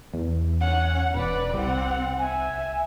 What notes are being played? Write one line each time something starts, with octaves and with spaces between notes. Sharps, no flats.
E2
C#4 F#5
E1 B4 D5
C2 C4 F#5
E5 G#5